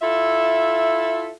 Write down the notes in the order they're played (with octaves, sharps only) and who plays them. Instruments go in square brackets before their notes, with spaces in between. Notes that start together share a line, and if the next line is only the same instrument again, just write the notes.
[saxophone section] E4 F4 A4 E5